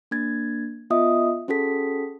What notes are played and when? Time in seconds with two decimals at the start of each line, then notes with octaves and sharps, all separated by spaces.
0.11 A#3 D4 G#6 A6
0.90 B3 F4 D#5 E5 D#6
1.48 C#4 F#4 G#4 A4 B6